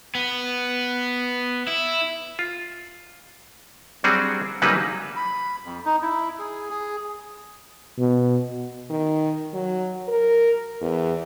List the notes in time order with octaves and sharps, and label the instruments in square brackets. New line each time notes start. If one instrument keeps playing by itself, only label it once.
[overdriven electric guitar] B3
E4
[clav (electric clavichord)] F4
F#3 G3 C4 D4 F#4 G#4
C#3 F#3 G3 A#3 D#4 B4
[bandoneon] B5
F2
D#4
E4
G#4
G#4
[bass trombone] B2
[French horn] D#3
F#3
A#4
E2